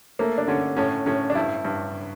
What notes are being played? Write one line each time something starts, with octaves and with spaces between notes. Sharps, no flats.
A3 A#3
D4
D3 C#4
A2 C#4
A2 C#4
D4
G2 E4
G2